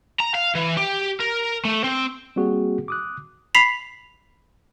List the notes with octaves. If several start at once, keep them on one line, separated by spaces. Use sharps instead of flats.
A#5
F5
E3
G4
A#4
A3
C4
G3 A#3 C4 F#4 G#4
D6 D#6 F#6
B5 B6 C7 F7